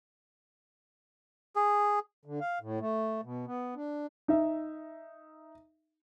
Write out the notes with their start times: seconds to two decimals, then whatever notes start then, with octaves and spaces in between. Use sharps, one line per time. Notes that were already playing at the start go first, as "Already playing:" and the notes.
1.56 G#4
2.25 D3
2.40 F5
2.61 A2
2.80 A3
3.24 B2
3.47 B3
3.76 D4
4.28 D#4 E5